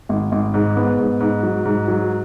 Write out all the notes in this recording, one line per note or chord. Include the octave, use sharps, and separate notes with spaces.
G#1
G#1
G#2
B3
G#2
G#2
F#3
G#2
F#3